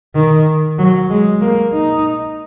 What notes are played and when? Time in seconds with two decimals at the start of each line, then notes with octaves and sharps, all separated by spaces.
0.15 D#3
0.79 F#3
1.10 G#3
1.41 A#3
1.74 D#4